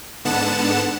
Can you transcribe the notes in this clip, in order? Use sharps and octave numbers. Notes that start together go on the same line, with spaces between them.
G#2 D3 B3 F#5 A5 E7